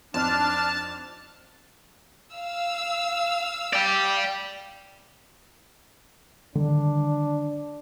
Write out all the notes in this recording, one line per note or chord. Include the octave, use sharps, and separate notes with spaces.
F2 C4 D4 D#4 A5 F6
F5 E6
D5 G5
D3 D#3 G3 D4